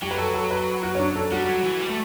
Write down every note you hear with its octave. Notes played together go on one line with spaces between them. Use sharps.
F#3 G4
B4
A4
A4
B4
F#4
C#4
D4
A4
G3 F#4
F#3
E3
G3
A3